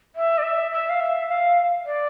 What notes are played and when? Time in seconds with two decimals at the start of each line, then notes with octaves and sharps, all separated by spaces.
0.16 E5
0.38 D5
0.43 E5
0.71 E5
0.89 F5
1.00 E5
1.28 F5
1.86 D5